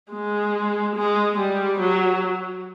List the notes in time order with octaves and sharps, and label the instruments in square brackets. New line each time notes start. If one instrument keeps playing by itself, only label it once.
[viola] G#3
G#3
G3
F#3